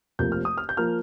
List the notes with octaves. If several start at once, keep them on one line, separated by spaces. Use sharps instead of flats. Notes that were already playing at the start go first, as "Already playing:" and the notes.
F1 F2 F3 A#3 G6
F6
D#6
F6
G6
F3 A#3 F6